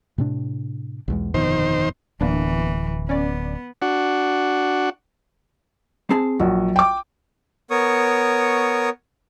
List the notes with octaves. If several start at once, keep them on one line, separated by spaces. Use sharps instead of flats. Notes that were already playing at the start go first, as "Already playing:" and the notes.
A2 C3 D4
B1 E2 G#3
G1 F2 B2 D#3 C5
D1 E3 A#3 B3 D4
B3 C#4 D5
D4 F#4 F#5
C4 G#4 A5
A#1 F#3 F#4
G5 D6
B3 A#4 C#5 C#6 D#6